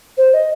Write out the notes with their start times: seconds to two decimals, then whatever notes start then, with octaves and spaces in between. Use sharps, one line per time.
0.17 C5
0.33 D#5